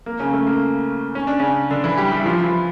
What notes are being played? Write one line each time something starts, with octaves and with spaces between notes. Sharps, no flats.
A#3
C#3 C#4
A3
A#3
C#4
D4
C#3 C#4
D3 D4
E3 E4
G3 G4
G3 G4
E4
F3 F4
E3 E4